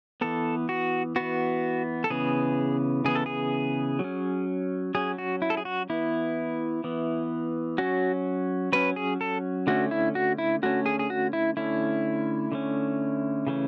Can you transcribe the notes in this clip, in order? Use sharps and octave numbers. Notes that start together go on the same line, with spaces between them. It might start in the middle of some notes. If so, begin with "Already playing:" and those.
E3 B3 A4
F#4
E3 B3 F#4
A4
C#3 E3 B3 G#4
C#3 E3 B3 G#4
A4
G#4
F#3
C#4
F#3 C#4 G#4
F#4
E4
A4
G#4
F#4
E3 B3 E4
E3 B3
F#3 C#4 F#4
F#3 C#4 B4
G#4
A4
D3 A3 C#4 F#4
E4
F#4
E4
D3 A3 C#4 F#4
G#4
G#4
F#4
E4
D3 A3 C#4 E4
D3 A3 C#4
C#3 E3 A3 C#4